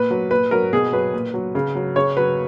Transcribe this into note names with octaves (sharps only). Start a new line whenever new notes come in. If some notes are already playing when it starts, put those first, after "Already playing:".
Already playing: A#2 B4
F#3
A#2 B4
F#3 A#4
B2 G#4
F#3 B4
A#2
F#3
C#3
F#3
C#3 C#5
F#3 B4